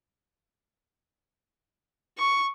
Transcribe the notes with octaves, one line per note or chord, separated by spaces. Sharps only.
C#6